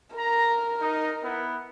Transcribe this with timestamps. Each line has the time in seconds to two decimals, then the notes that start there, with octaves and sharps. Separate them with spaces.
0.16 A#4 A#5
0.80 D#4
1.23 B3 E4